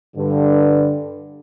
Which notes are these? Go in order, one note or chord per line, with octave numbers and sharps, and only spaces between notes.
G2 D3